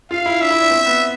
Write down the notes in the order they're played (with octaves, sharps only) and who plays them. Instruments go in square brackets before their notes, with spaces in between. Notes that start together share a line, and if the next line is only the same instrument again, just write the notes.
[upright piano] F4 [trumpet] F5
[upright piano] E4
[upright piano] D4 [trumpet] E5
[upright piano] E4
D4
C4
B3